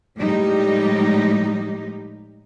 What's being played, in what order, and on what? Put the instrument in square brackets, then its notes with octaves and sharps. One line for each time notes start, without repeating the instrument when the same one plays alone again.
[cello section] A2 F3 G3 G#3 D#4 G4